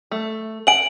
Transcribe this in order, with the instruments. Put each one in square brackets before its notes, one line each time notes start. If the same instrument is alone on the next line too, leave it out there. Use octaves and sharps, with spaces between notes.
[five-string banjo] A3
[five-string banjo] F#5 G#5 [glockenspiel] D7 F#7